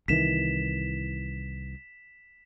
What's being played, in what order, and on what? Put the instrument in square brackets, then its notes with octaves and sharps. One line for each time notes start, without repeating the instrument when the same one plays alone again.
[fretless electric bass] C2 D#3 E3 [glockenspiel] B6 E7